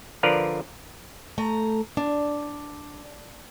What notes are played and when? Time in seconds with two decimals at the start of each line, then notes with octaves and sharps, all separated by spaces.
0.23 D3 F3 A#4 B4 D5 F5
1.38 A3 A#5
1.97 D4